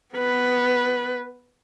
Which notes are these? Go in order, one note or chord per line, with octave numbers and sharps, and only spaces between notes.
B3 B4